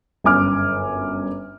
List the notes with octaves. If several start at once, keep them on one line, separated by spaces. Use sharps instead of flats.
G1 F#2 G#5 D6 F6